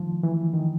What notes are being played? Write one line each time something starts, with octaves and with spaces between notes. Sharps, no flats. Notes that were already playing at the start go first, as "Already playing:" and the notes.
Already playing: D#3 F3
E3
D#3